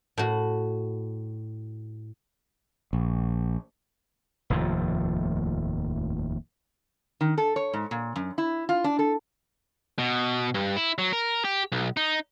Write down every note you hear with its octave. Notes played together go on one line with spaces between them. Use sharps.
A2 F#4
A#1
F1 D#2 A2 F3
D#3
A4
C#5
G#2
A#2
F#2
E4
F4
D4
A4
B2
G2
E4
F#3
A#4
G4
B1
D#4